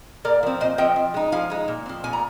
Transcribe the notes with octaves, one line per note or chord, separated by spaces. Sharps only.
A#2 A#4 D5
F3 C4
A#2 C5 D#5
F3 C4 D#5 G5
F3
G#3 D#4
F3 F5 G#5
G#3 D#4
A#2
F3 C4
A#2 G#5
A#5